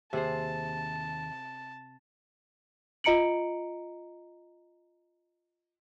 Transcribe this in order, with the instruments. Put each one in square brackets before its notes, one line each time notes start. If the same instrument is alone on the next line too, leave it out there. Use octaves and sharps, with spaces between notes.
[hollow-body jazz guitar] D#2 G#4 C5 [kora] C3 [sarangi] A5
[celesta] F4 D#5 A#5 C#7 D7 F#7